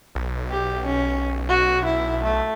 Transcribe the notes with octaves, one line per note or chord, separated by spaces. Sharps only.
B1
G4
C#4
F#4
E4
A3